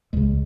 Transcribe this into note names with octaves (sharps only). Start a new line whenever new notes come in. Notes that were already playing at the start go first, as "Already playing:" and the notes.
C#2 C#3 G#3